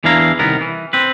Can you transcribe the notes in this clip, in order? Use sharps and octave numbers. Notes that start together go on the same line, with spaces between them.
E2 E3 D4 E4 F5 A#5
C2 D#3 B3 A#4
E3
C4 B4